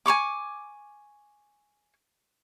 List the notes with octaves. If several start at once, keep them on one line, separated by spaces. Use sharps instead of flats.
G#5 A#5 C#6 D6